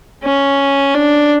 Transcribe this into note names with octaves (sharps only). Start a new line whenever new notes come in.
C#4
D4